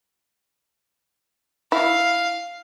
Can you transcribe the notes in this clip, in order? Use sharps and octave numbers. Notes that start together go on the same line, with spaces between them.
E4 F5